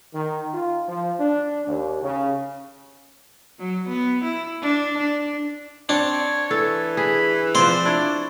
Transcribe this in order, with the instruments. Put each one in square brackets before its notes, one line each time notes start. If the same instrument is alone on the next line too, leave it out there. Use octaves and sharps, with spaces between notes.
[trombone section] D#3
F4
F3
D4
D#2
C#3
[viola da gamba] F#3
B3
E4
D4
D4
[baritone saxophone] C4 [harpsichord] D4 [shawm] C#5
[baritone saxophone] E3 [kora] A4
[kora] G#4 [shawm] B5
[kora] F3 C4 [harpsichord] C5 [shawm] D5
[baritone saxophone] D4 [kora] E4 C#5